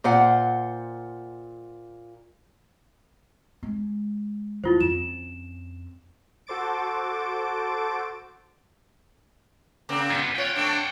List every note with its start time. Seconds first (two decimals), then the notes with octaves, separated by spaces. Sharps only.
0.04 A#2 C5 F#5
3.63 G#3
4.64 D#2 E4 F4 C5
4.80 F2 C#4 E7
6.47 F#4 A4 C5 D6 A6 D7
9.89 C#3 A#3 C4
10.11 F#2 B3
10.35 F4 C#5 F#5 G5
10.56 A3 C4 D4